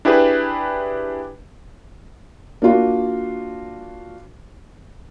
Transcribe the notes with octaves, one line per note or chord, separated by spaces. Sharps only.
D4 E4 G4 G#4 B4
A#3 D4 F4 F#4